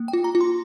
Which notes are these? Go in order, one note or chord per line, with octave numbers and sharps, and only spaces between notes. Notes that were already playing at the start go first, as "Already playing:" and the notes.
Already playing: A#3
G5
F4
A#5
F4
C6